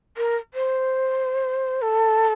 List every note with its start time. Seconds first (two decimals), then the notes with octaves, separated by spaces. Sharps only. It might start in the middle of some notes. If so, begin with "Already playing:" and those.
0.17 A#4
0.54 C5
1.82 A4